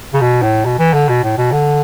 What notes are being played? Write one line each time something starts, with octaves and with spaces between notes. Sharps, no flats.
C#3
B2
A2
B2
E3
D3
B2
A2
B2
D3